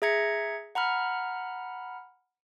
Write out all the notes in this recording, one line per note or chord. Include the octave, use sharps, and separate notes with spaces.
G#4 E5 A#5 G#6 A#6 C#7
F#5 A#5 B5 F6